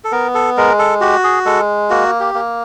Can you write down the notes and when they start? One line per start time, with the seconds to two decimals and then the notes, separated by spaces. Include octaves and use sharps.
0.04 A4
0.12 B3 A#4
0.34 A4
0.57 G#3 A#4
0.79 A4
1.01 F#4 G4
1.24 G#4
1.46 G#3 A4
1.90 A#3 F#4
2.20 G4
2.34 A#3